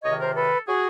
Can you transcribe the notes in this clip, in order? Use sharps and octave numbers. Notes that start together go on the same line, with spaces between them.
C#2 C3 D#3 C#5 D#5
A#4 C5
A4 B4
F#4 G#4